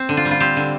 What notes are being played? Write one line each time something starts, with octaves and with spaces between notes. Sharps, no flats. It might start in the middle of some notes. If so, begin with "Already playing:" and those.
Already playing: C4
D3
F4
G3
F4
C4 G4
D3